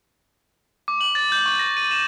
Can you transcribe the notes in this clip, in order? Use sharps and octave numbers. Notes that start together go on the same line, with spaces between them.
D6
F#7
A6
G6
C#6
A#6
D#7
E7